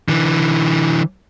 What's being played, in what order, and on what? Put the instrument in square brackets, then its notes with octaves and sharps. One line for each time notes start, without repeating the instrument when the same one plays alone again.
[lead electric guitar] D3 E3